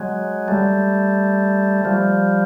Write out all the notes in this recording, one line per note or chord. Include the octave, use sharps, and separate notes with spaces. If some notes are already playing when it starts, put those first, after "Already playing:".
Already playing: F#3 G#3
G3 A3
F3 G3